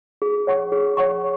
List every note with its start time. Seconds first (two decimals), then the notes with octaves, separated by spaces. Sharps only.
0.22 G#4
0.47 C#5 F#5 C#6
0.72 G#4
0.97 C#5 F#5 C#6